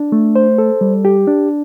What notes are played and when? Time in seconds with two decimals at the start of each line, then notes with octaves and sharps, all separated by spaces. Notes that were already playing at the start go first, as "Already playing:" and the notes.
Already playing: D4
0.12 A3
0.36 C5
0.58 A4
0.81 G3
1.05 G4
1.27 D4